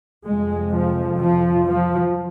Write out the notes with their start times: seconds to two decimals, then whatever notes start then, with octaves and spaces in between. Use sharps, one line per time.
0.25 F2 C3 G#3
0.72 F3
1.18 F3
1.66 F3